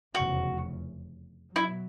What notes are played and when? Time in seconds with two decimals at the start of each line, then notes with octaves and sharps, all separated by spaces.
0.14 F1 E2 C#3 F#4
1.56 B2 F#3 E4